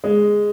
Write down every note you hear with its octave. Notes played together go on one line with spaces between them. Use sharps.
G#3